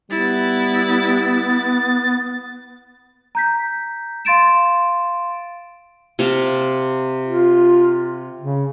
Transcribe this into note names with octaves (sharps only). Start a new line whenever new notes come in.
G3 B3 E4 A6
A#5 G6 B6
F5 C6 A6 D7 E7
C3 F5 A5
F4
C#3